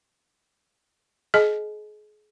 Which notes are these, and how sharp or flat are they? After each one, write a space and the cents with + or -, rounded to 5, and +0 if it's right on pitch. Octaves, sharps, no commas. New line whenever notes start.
G#4 +30 D#5 +0 G#5 +40